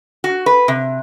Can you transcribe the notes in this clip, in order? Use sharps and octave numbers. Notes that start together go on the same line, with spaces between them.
F#4
B4
C3